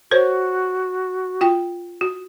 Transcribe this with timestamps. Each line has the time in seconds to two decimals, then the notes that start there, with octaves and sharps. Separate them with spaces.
0.11 F#4 A#4 C5 C#5
1.41 F4 G5
2.01 F#4